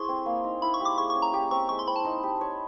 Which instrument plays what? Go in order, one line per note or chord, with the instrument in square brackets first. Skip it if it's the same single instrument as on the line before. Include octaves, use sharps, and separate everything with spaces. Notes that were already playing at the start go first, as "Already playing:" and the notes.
Already playing: [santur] E4 G#4 A4 C5 [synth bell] C6 C#6
[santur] C4
A#3
D#4
[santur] E4 [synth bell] B5
[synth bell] C#6
[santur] G4 [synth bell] D6
[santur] G#4 [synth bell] C#6
[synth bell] C#6
[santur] C#4
[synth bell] A#5
[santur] G4
[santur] C4 [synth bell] C#6
[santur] G#3 [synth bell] C#6
[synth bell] C6
[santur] C4 [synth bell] B5
[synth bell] A5
[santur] D#4
G4
C#5